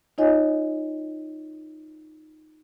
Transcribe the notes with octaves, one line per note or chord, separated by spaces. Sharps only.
D#4 F4 C#5 D#5 G#5